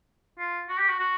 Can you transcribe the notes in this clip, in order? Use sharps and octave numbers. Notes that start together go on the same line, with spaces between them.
F4
F#4
G4
F#4
F#4